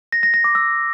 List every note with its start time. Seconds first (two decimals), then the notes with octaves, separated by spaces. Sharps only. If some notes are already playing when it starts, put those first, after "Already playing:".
0.12 A#6
0.23 A#6
0.34 A#6
0.44 D6
0.55 E6